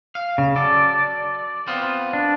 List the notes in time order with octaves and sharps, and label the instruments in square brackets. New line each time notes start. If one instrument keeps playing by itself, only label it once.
[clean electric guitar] F5
[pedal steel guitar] C#3
[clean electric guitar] F#3 A4 [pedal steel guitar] D5
[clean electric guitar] B3 C4 F4
[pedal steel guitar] D4